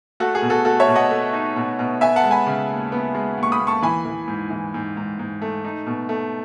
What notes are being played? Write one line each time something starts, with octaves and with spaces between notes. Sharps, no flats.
A3 F#4 A4
G#4
B2
F#4 A4
A3 F#4 A4
C#5 E5
B2
D#5 F#5
A3
D#4
B2
B2
B3 E5 G#5
F#5 A5
G#3
G#5 B5
C#3
D#2
B3
G#3
D#2
C#6
B5 D#6
D#2
A5 C#6
E3 G#5 B5
E3
G#2
E3
G#2
G#2
G#2
A3
D#4
B2
A3